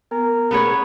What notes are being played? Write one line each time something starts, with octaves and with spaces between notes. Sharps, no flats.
B3 A#4
A3 B3 C#4 G#4 B4 C#5